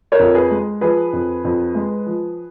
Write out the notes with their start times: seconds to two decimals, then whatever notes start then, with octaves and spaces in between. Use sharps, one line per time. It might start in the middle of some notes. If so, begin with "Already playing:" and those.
0.12 A#4 C#5
0.19 F2
0.35 G#4 B4
0.50 G#3
0.81 F3 G#4 B4
1.13 F2
1.44 F2
1.75 G#3
2.06 F3